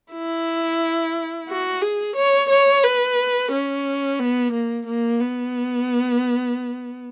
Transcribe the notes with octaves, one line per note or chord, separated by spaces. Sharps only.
E4
F#4
G#4
C#5
C#5
B4
C#4
B3
A#3
A#3
B3